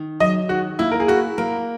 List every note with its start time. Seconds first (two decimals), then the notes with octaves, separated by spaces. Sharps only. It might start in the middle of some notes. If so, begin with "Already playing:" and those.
Already playing: D#3
0.20 F#3 D#5
0.49 D#3 F#4
0.79 A#3 E4
0.91 A#4
1.00 G#4
1.08 E4 F#4
1.38 A#3 A#4